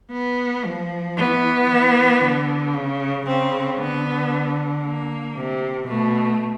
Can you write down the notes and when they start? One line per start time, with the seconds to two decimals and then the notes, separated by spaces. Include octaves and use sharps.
0.12 B3
0.65 F3
1.17 E3 B3
1.69 E3
2.21 D3
2.74 C#3
3.27 C#3 C4
3.78 D3 B3
4.84 A#3
5.36 C3
5.88 B2 A3